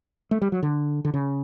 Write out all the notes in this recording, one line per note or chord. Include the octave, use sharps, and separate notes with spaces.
A3
G3
F#3
D3
D3
C#3